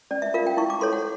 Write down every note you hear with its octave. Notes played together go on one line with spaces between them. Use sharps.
C#4 D5
E5
F4 A#4 F5
G5
E4 C#6
D6
A4 C#5 C6
F#5